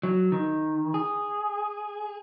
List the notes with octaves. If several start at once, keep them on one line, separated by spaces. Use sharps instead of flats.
F#3
D#3
G#4